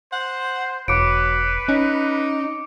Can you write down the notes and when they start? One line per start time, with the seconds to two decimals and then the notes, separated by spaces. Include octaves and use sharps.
0.13 C5 F#5
0.88 E1 F#3 B4 D6 C#7 D7
1.68 C#4 D#4